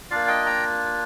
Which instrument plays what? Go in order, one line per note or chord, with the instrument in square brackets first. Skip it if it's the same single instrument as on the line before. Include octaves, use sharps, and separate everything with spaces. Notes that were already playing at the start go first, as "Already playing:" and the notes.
[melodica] A#3 D4 F4 D5 F5
D#5 G5
G5 A#5